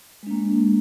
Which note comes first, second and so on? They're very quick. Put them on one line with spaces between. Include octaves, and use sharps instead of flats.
G#3 D4 A#3